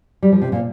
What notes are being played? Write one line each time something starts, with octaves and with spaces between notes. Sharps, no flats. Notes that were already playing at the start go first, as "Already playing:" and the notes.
G3
F3
C3
A#2